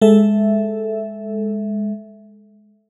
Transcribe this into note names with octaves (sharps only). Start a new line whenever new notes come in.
G#3 A4 E5